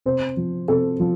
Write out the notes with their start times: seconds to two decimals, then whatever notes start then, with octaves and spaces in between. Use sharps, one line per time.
0.06 C3 C5
0.37 F3
0.68 C3 A4
1.00 F3